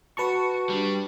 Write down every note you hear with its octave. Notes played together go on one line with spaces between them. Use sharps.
F#4 B4 A5 C#6
G3 D4